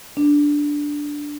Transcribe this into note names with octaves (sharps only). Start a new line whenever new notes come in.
D4